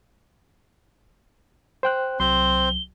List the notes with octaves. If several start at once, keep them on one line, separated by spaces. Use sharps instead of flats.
C5 G5 F#6
C2 F#3 C4 C5 C6 G7